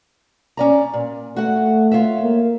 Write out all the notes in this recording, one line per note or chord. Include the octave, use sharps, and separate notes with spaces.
C#4 D5 A#5
A#2
A3 F#4 F#5
F4 C#5 E5
A#3